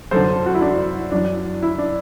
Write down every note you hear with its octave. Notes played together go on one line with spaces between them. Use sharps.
F#2 D3 A4 C5
F#4
E4
D4
F#2 E3 D4
E4
D4